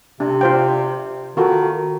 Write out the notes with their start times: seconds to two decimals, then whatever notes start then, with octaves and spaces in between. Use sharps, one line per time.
0.20 C3 D4
0.41 F4 C5 G5
1.37 D#3 F4 F#4 A4